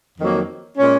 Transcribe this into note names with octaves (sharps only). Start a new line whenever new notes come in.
F2 D#3 F#3 A#3
A#2 G#3 C#4